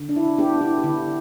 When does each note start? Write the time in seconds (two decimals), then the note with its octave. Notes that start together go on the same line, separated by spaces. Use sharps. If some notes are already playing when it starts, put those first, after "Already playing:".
Already playing: D3
0.09 D4
0.16 E4
0.38 B3 D4 G4
0.61 E4
0.78 G4
0.83 D3 E4